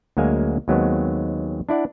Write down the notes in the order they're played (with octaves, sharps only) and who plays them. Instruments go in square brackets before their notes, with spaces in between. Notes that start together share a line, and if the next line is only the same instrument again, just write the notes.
[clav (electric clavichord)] D2 F#3 G#3 A#3 F5 G#5
D#2 D#3 F#3 G#3 B3 C4
D4 E4 D5 F#5